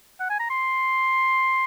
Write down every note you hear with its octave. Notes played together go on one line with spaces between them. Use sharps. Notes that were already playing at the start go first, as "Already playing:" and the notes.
F#5
G#5
A#5
C6